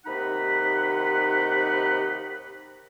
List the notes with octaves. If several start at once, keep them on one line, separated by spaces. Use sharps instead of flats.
D#2 C3 D#4 F#5 B5